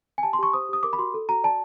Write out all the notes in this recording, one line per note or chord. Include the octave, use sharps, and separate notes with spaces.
G#5
G4 A5
C6
G4 C#6
C5 D#6
G4 D#6
A#4 D6
B5
F#4 C6
A4
F#4 A#5
D5 A5